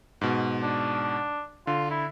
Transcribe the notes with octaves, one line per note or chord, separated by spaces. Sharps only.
G#2 B2
D4
D3 F4
E4